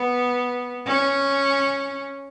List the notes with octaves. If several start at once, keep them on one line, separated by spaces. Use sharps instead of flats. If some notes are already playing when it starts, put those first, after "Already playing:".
Already playing: B3
C#4